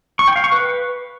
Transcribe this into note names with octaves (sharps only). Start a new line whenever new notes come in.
C#6
G5
F5
C#6
B4